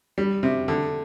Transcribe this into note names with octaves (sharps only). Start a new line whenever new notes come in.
G3
C3
D3